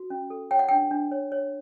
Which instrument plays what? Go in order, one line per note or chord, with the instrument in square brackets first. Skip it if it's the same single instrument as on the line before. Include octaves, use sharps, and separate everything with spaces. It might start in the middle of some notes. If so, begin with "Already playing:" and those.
Already playing: [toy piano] F#4
C#4
A4
C#5 G5
F#5
D4 G5
D4
C#5
C#5